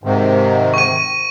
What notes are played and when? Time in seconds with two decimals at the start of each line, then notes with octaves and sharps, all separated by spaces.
0.04 G#2 C3 D#3
0.74 C#6 D#7